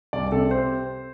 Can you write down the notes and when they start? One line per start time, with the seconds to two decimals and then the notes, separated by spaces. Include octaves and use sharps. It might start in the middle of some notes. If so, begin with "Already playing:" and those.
0.13 C2 D5
0.32 C3 A4
0.51 C5